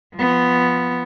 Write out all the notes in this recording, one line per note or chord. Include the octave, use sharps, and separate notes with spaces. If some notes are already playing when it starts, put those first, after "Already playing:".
F3 B3